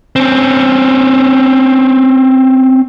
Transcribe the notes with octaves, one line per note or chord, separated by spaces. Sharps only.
C4 C#4